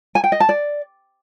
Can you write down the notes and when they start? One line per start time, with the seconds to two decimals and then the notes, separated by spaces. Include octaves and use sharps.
0.15 G#5
0.24 G5
0.32 D#5
0.40 A5
0.49 D5